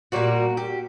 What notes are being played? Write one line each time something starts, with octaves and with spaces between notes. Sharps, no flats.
A#2 G3 A#3 F#4
G4